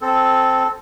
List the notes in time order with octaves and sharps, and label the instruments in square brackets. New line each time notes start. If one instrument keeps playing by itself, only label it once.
[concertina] C4 A4